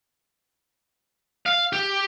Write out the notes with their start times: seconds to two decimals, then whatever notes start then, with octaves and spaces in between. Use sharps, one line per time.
1.46 F5
1.73 G4